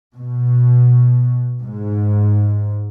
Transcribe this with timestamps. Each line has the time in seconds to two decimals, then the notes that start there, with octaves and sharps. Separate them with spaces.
0.16 B2
1.62 G#2